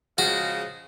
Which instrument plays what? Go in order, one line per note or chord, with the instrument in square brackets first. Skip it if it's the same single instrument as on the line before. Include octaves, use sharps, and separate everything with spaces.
[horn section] C#3 F3 G#3 [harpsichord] F#4